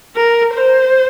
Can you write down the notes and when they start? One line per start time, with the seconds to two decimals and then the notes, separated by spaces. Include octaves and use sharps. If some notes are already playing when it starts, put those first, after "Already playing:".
0.16 A#4
0.54 C5